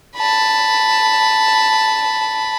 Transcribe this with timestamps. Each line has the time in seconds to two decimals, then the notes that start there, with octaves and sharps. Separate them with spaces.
0.16 A5 B5